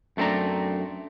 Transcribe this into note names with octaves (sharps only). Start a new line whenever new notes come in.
F#2 A3 C4 D4 A#5